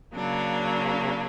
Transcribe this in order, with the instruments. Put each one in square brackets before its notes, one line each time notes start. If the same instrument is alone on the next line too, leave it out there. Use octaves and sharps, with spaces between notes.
[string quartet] C#3 F#3 A#3 D4